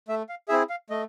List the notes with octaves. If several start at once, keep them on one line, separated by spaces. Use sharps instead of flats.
A3 E5
F5
C4 E4 G#4 E5
F5
A3 D#5